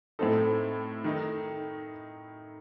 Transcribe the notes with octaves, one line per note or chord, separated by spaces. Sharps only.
A2 A3 C4 D#4 A4
D#3 A3 D#4